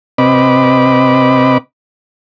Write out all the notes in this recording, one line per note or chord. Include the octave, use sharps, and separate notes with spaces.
C3 C4 B4 D#5 B5 D6